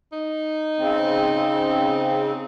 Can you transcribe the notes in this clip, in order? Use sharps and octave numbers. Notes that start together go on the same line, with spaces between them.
D#4
C#3 C4